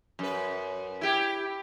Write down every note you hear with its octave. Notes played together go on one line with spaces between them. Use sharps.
F#2 B4
E4 G4